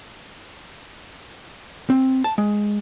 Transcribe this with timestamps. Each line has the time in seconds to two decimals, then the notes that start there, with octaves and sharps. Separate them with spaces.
1.90 C4
2.24 A5
2.38 G#3